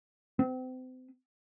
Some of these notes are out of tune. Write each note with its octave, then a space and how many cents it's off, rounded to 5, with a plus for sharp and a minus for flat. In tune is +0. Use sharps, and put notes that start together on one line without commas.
C4 -35